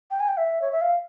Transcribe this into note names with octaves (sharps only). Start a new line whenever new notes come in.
G5
G#5
G5
E5
C#5
E5
F5